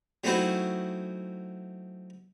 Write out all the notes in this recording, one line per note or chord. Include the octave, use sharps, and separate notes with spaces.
F#3 A3 C4 D#4 E4 F#4